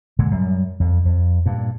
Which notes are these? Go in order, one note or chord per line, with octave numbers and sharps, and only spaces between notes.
A#2 D3 G#3
F#2 G3
F2
F2
G2 A#2